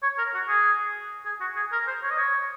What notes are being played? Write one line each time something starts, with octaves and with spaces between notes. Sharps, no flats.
C#5
A#4
F#4
G#4
G#4
F#4
G#4
A#4
C5
C#5
D#5
C#5